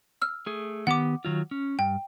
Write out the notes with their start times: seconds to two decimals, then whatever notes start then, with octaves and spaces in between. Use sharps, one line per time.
0.22 E6 F6
0.46 A3 G#4
0.87 D#3 B3 G4 F#5 D6
1.25 D#3 F#3 F4
1.51 C#4
1.79 G2 G5